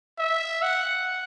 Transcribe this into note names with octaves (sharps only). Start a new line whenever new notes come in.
E5
F#5